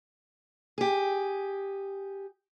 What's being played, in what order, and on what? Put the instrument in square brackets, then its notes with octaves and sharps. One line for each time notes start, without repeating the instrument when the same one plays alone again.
[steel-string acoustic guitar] G4 G#4